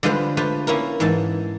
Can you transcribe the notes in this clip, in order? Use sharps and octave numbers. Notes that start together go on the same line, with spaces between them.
D3 G3 G#3 F4 B4 C5
A3 F4 G4 B4 C5
A#3 C#4 E4 A#4
G#2 E3 G#3 A5